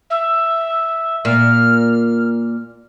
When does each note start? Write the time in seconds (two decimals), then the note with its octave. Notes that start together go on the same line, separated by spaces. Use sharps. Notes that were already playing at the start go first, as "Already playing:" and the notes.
0.10 E5
1.25 A#2 F6